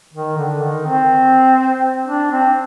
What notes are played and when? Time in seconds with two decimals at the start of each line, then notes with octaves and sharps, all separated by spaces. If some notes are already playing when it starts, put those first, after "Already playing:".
0.14 D#3
0.37 D3
0.62 D#3
0.86 C4
2.07 D4
2.31 C4